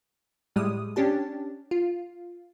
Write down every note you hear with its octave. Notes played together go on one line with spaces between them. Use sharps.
A2 G3 G#3 D#6
C#4 D4 G4 A5
F4